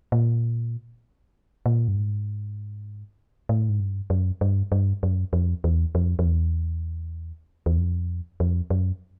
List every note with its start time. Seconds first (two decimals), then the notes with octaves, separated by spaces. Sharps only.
0.12 A#2
1.66 A#2
1.88 G2
1.96 G#2
3.49 A2
3.69 G#2
3.80 G2
4.10 F#2
4.41 G2
4.72 G2
5.03 F#2
5.33 F2
5.64 E2
5.95 F2
6.19 F2
6.25 E2
7.66 E2
7.78 F2
8.40 F2
8.70 F#2